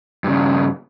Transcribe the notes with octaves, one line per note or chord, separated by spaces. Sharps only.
G2 C#3